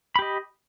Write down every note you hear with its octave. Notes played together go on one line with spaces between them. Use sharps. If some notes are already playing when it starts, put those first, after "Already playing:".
G4 D#5 B5